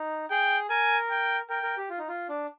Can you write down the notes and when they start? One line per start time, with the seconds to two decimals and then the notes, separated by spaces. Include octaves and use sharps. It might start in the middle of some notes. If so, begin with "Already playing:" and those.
Already playing: D#4
0.30 G#4 G5
0.70 A#4 G#5
1.11 G5
1.49 A#4 G5
1.63 A#4
1.77 G4
1.89 F4
1.99 D#4
2.09 F4
2.29 D4